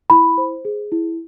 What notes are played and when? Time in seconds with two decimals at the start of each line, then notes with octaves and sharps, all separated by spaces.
0.10 E4 B5
0.38 C5
0.65 G#4
0.92 E4